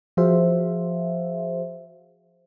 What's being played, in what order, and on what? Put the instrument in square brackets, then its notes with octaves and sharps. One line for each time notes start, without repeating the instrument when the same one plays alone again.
[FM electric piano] F3 F#4 G#4 C5 E5 F5